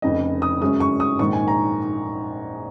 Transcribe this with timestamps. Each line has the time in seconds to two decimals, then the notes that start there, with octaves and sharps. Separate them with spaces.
0.02 F1 F2 C#3 D#5
0.42 D#6
0.61 F#2 C#3 G#3 C#4 D#6
0.80 C#6
1.00 D#6
1.19 A#1 G#2 D#3 C#6
1.33 G#5
1.48 A#5